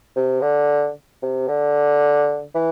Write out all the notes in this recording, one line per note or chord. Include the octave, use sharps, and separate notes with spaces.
C3
D3
C3
D3
E3